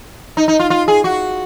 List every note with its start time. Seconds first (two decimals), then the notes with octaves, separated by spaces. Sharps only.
0.37 D#4
0.48 D#4
0.59 F4
0.70 F4
0.88 G#4
1.04 F#4